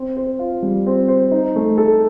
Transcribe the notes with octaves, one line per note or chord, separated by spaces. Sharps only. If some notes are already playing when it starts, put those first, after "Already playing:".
Already playing: C4
C5
F4
G3
C4
C5
D#4
A3
A4